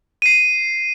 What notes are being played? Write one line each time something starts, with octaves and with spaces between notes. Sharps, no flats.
C7 D#7